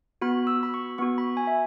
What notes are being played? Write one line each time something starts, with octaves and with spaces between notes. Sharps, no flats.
B3 F#4 B5
E6
B5
C#6
B3 F#4 C#6
B5
G#5
E5